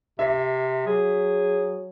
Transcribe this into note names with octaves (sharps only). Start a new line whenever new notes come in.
C3 E5
F#3 G#4